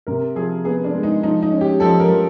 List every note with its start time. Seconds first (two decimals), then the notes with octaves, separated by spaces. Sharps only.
0.07 C3 A#4
0.35 F3 G#4
0.65 B3 G#4
0.84 D4
0.93 G#3
1.03 D#4
1.23 F3 D#4
1.42 D#4
1.52 C#4
1.61 G4
1.80 F3 A4
2.00 A#4
2.09 F3